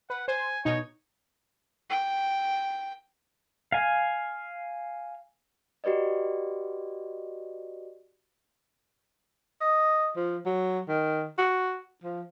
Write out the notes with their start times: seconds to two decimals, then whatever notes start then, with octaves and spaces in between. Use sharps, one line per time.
0.10 B4 F#5
0.28 C5 G#5
0.65 B2 D#4 C#5
1.90 G5
3.72 F5 G#5
5.84 F#4 G4 B4 D5 D#5
9.61 D#5
10.16 F3
10.46 F#3
10.89 D#3
11.38 F#4
12.04 F3